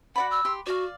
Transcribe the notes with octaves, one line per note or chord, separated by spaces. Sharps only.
F#4 D5 F#5 B5
E6
G4 C6
F#4 D5 F5